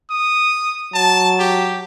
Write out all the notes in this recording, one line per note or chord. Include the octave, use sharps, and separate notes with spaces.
D#6
F#3 A5
G4